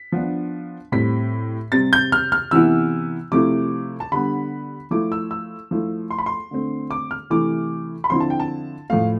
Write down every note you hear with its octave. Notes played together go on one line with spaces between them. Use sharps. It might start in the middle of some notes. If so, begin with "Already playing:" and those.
Already playing: B6
F3 B3 D4
A2 G3 C4 B6
C3 G3 C4 A6
G6
F6
F6
C3 E3 B3 E4 E6
C3 F3 A3 C4 E4 D6
A5
D3 G3 B3 B5
F3 A3 E4 D6
E6
E6
F3 A3 E4
C6
B5
C6
D3 A3 C4
D6
F6
C3 E3 A3 E4 D6
B5
D3 F3 C4 E4 C6
A5
G5
A5
A2 F3 A3 F5